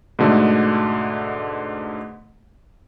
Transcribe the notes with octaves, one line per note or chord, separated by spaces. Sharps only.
G#2 B2 D3 A3